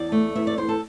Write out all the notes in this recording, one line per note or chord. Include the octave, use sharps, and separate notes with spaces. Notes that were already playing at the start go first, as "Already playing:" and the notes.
Already playing: E2 D5
A3
E2 E5
D5
E2 C5
A4